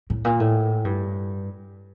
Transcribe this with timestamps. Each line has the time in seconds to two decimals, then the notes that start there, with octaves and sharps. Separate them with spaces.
0.10 A2
0.25 A#2
0.40 A2
0.85 G2